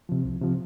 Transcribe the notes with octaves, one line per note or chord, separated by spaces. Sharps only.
C3 F3
C2
C3 F3